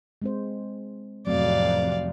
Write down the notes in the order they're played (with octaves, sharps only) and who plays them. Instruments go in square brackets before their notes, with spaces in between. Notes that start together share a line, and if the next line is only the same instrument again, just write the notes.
[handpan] G#3 C4 C5
[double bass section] A1 F2 C3 [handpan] F#3 A3 C4 [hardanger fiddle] D5 F5